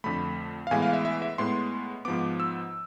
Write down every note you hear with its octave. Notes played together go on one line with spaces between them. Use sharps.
F2 D3 A3 B5
F5
A2 E3 G#3 B3 G#5
F5
E5
E5
E5
A2 G#3 B3 C6
G#2 F3 B3 D6
E6